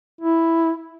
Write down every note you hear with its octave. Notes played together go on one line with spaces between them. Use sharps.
E4